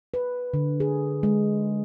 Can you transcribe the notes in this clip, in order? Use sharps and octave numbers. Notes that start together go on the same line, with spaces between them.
B4
D3
G#4
G#3